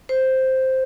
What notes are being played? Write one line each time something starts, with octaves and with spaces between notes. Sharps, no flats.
C5